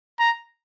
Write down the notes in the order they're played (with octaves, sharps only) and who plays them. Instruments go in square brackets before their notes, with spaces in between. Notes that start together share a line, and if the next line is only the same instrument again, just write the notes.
[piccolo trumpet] A#5